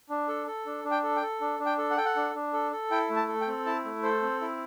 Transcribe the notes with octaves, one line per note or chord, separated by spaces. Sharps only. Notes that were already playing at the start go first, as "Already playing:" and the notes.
D4
A4
A4
D4
D4
G5
A4
G5
A4
D4
D4
G5
A4
F#5
A4 G5
F#5
D4
D4
A4
A4
E4 G5
A3
A5
A4
G5
C4
E4 A5
A3
A4 C5
C4
E4